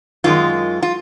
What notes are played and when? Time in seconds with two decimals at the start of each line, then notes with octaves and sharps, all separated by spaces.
0.24 F#2 D#3 G#3 F4
0.83 F4